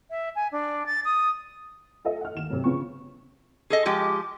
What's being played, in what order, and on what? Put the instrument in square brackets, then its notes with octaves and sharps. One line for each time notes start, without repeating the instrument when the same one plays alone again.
[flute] E5
G#5
D4
A6
D#6
[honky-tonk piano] F4 A4 D#5 E5
F#5 F6
D#2 E7
C3 F#3
C#3 F3 B3 C#6
[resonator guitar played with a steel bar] G#4 A4 D#5
F3 G#3 G4